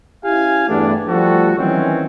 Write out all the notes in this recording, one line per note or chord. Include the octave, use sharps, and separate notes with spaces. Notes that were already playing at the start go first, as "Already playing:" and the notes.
C#4 E4 G4 F5 G#5
E2 G2 A3 B3 D4
F3 G3 A3 F#4 A4
D#3 E3 F#3 C4 C#4